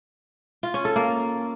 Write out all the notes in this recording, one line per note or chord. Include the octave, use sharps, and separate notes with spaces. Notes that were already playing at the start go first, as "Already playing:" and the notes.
F4
C#4
A4
A#3